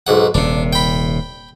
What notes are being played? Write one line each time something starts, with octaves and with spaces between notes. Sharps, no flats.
B1 G#2 F#5
D#1 C3 D4
G5 B5